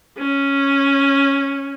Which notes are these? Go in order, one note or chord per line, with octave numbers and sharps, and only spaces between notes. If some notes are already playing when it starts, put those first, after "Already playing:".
C#4